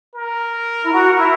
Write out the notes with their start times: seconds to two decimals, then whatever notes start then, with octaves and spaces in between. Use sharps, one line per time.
0.15 A#4
0.82 E4
0.92 F#4
1.17 E4